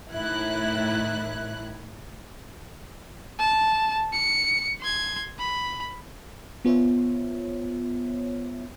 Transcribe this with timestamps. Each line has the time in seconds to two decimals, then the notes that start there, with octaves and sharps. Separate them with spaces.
0.12 A2 D#3 E4 F#6
3.39 A5
4.13 C#7
4.80 C6 G#6
5.39 B5
6.65 B3 F4 C5 C#5 E5